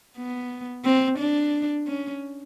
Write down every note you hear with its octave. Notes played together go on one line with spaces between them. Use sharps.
B3
C4
D4
C#4